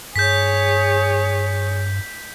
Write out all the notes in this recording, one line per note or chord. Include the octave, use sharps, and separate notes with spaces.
G2 G#4 C#5 G6 B6